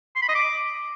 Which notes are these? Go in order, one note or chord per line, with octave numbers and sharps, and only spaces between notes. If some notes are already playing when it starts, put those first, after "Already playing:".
C6
B5
D#5
D6